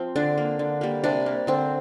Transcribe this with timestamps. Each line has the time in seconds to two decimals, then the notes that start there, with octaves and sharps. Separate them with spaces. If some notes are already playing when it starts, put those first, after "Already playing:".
Already playing: F3 C4
0.16 D3 D4
0.38 A#3
0.59 D3
0.81 G3 A#3
1.04 C3 D4
1.26 A#3
1.47 D3 C4